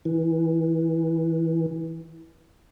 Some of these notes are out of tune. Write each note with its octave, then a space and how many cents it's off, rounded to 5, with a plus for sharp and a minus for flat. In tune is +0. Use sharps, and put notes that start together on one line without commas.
E3 -15